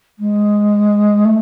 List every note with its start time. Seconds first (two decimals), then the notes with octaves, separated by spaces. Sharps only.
0.19 G#3
1.25 A3